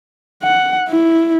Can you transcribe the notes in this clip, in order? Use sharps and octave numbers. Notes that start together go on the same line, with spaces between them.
F#5
E4